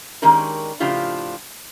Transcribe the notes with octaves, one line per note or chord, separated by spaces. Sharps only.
D#3 G#3 C#4 D4 G4 A#4
A2 C#3 F3 D4 F4 G4